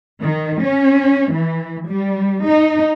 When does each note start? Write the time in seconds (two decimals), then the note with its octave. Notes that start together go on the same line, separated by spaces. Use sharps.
0.21 D#3
0.62 C#4
1.32 E3
1.88 G3
2.45 D#4